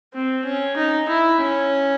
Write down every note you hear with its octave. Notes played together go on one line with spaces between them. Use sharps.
C4
C#4
D#4
E4
C#4